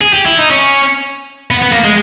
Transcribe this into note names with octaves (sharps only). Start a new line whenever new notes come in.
G#4
G4
E4
D#4
C#4
B3
B3
A#3
G#3